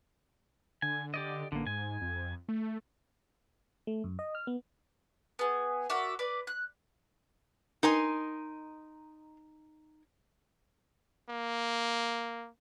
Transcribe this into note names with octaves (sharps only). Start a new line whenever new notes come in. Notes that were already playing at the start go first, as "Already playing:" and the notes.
D3 G#5
G4 D5 D#5
A1 D3 A#3
G#2 G#5
F2
A3
A3
F#2
D#5
F6
B3
B3 G#4
F#4 A#4 D5 E5
B4 D5 D6
F#6
D#4 A#4 D#5 G#5 C6
A#3